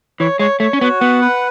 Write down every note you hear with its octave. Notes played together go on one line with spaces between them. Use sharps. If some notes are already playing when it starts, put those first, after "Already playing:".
E3 C#5
G#3 C#5
A3 C#5
C#4
B3 F#4
B3 F#5
B4